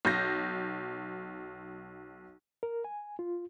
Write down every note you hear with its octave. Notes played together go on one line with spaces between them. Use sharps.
B1 G6 A#6
A#4
G#5
F4